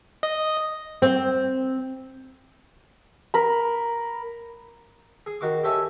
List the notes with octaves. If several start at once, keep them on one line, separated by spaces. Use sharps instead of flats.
D#5
C4
A#4 B5
G#4
D#3 F#4 D6
G4 A4 C#5 E5 G#5